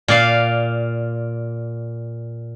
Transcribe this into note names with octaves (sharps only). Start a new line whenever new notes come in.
A#2 D5 F5